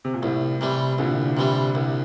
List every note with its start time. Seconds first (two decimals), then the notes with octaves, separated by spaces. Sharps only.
0.05 C3
0.14 A#2
0.22 C2 A2
0.61 C3 E3 G3
0.98 C2 A#2 D3
1.37 C3 E3 G3
1.75 C2